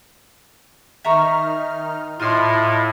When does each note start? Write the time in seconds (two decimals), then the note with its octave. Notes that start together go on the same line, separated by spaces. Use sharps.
1.04 D#3 D#4 E5 A#5 C#6 F6
2.20 A2 F4 D#5 E5 A5 B5 C6